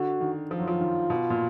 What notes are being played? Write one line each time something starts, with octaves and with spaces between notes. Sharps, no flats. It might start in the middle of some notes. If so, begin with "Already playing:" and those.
Already playing: D3 F#4
D#3
F3 F4
F#3
F3
D#3
B2
A#2